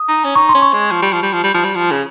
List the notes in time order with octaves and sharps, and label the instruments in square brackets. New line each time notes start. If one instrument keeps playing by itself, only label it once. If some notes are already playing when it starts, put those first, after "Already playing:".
Already playing: [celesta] D#6
[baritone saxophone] D#4
C#4
[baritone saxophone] D#4 [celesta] C#6
[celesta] C6
[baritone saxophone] C#4
[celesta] C#6
[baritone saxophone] G#3
F3
G3
F3
G3
F3
G3
F3
G3
F3
C#3